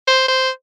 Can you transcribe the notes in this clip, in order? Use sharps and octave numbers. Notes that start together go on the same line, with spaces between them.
C5
C5